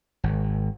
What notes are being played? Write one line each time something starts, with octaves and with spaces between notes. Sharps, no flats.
G#1